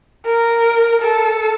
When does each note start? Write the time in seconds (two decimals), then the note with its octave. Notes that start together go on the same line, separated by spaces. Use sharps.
0.26 A#4
1.02 A4